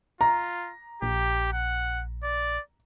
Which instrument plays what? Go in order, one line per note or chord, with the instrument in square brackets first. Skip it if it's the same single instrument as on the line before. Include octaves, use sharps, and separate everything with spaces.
[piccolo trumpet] F4 [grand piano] A#5
[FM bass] A#1 [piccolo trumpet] G4
[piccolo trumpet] F#5
D5